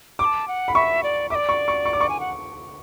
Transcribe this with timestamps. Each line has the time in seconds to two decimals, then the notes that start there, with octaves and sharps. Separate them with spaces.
0.19 C#6 D6
0.25 A5
0.48 F#5
0.68 B5
0.75 E5 C#6
1.03 D5
1.30 E5 D6
1.35 D5
1.49 C#6
1.68 C#6
1.86 C#6
1.93 D6
2.01 C#6
2.09 G#5
2.20 F#5